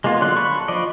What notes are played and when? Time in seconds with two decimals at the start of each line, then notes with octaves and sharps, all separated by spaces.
0.04 G#3 A#3 B3 F4
0.21 D3 F#3 D5 C6 F#6
0.36 A5 B5 C#6
0.68 F3 D5 D#5